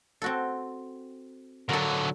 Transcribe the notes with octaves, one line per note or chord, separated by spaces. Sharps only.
C4 F#4 A4
D3 F#3 A4 A#4